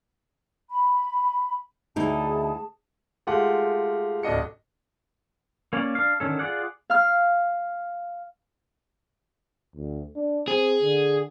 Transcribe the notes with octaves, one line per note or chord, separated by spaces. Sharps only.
B5
D2 D#4 E4 G#4 A5
G#3 A3 F4 G4 F#5
D1 A3 D4 D#5 C#7
A#3 C#4 C#5 D5
D4 F5
D3 D#3 C#4 A4
F4 G#4 D5 F#5
F5 F6
D2
D4
C4 G#4
D3